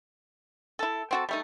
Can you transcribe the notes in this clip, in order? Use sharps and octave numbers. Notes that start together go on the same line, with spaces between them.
E4 A4
C4 F#4 A4
G3 A3 D#4